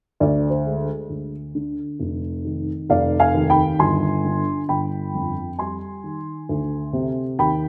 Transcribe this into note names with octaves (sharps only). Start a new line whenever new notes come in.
D2 D5
C5
G#3
D2
D3
F1
D#3
F1 D5 F5
F5 G#5
D#2
G5 B5
G1 G#5 C6
D3
G1 G5 B5
F2
G3 G#5 C6
D#3
D2
C3
D#2 G5 B5